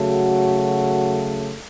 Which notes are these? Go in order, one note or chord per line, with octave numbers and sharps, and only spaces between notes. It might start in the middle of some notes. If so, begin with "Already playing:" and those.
Already playing: C#3 F#3 A3 F#4